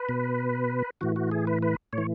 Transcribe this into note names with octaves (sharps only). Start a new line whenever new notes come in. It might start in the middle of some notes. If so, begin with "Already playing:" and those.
Already playing: B4
B2
A2 E3 F#4
F#4
G#4
B4
B4
A2 C#5
E3